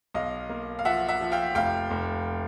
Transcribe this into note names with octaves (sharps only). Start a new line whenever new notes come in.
B1 D#5 F5
A#3
F5
F3 E5 F#5
E5 F#5
F3
F5 G5
F1 F5 G5
F1